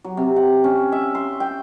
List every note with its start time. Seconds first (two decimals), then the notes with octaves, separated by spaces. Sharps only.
0.04 F#3
0.17 C3
0.36 F#5
0.64 C#4
0.92 E5
1.15 C6
1.40 G5